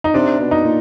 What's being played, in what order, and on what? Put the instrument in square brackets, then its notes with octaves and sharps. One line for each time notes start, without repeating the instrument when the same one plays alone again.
[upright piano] D#4
[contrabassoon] C3 [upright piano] D4
[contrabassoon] B2
[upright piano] D#4
[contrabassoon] A#2